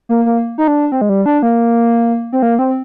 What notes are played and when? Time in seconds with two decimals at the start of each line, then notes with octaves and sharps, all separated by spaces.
0.09 A#3
0.26 A#3
0.58 D#4
0.68 D4
0.92 C4
1.01 G#3
1.09 G3
1.26 D4
1.43 A#3
2.33 C4
2.43 A#3
2.59 C4